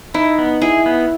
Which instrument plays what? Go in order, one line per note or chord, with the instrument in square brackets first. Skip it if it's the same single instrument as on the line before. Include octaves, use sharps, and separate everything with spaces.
[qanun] D#4 [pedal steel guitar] E4
[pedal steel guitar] B3
[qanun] E4 [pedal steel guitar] G#4
[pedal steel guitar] B3